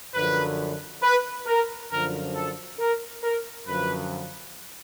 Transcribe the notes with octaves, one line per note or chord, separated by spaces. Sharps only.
F#2 D3 F3 B4
B4
A#4
F#2 D3 F3 A#4
A4
A#4
A#4
F#2 D3 F3 B4